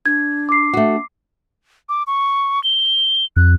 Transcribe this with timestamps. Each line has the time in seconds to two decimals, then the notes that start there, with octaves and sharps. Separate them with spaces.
0.06 D4 G#6
0.49 D6 C7
0.73 A3 F#4
1.89 D6
2.07 C#6
2.64 G7
3.36 F2 F#6